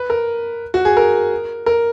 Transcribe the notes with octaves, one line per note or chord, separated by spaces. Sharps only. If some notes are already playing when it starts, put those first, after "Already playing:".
Already playing: B4
A#4
F#4
G#4
A#4
A#4